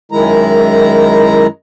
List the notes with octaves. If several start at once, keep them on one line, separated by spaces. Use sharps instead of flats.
F#2 D#3 G#3 E4 A#5